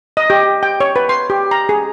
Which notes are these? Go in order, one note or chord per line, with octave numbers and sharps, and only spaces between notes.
D#5
G4
G5
C#5
B4
C6
G4
A#5
G#4